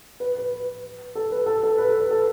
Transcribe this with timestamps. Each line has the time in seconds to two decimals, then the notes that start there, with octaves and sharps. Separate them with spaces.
0.20 B4
0.38 B4
1.15 A4
1.32 B4
1.46 A4
1.63 A4
1.78 B4
1.88 A4
2.00 B4
2.11 A4